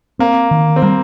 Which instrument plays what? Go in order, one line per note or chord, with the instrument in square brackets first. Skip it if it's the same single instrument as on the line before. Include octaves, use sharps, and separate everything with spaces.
[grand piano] A#3 [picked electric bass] C4
[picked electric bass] D#3
[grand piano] C4
[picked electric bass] G3 [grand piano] A#3